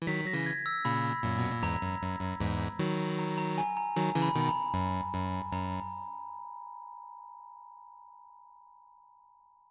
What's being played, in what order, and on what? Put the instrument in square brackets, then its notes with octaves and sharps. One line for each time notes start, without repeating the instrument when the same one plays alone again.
[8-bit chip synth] E3
[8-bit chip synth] D#3 F#3 [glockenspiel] B6
[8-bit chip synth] F#3 [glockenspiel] A#6
[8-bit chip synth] C#3 E3
[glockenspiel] G#6
E6
[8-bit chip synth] A#2 C#3 [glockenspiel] B5
[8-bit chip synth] F#2 A#2
B2
A#2
[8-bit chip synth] E2 G#2 [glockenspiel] A#5
[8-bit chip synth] F#2
F#2
F#2
E2 G#2
D#3 F#3
[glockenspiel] A#5
A#5
G#5
A#5
[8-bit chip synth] D#3 F#3 [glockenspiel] A#5
[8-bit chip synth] C#3 E3
[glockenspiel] B5
[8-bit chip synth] B2 D#3
[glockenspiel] B5
A#5
[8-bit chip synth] F#2
F#2
[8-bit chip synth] F#2 [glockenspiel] A#5